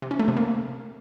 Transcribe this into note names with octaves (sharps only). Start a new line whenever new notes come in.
C3
C#4
A3
C3
A#3